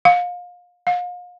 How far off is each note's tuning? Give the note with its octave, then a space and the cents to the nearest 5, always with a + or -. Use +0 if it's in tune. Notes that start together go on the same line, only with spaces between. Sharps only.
F5 +30
F5 +40